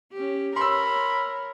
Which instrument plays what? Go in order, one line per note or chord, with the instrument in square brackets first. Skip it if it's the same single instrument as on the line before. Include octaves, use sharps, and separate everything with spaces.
[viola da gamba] C#4 G4
[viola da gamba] A#4 C#5 [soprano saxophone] B5 [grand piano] C6 E6